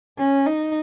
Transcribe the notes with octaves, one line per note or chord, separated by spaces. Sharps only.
C#4
D#4